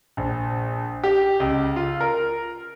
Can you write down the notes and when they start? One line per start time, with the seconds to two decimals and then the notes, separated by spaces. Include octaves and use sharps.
0.17 A#1
1.04 G4
1.40 C#2
1.76 F4
2.00 A#4